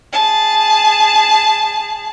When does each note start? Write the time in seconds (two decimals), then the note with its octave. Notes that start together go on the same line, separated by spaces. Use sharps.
0.13 G#4 A5